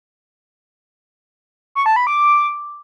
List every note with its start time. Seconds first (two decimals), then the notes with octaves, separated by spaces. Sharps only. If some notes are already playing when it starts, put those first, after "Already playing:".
1.75 C#6
1.86 A5
1.96 B5
2.07 D6